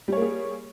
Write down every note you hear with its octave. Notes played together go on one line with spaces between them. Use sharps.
G3 A#3 G#4 C#5